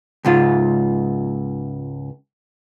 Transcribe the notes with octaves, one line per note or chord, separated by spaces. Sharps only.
C#2 G#2 F4